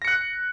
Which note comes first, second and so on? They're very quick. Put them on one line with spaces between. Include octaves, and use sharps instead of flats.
A#6 C#7 F#6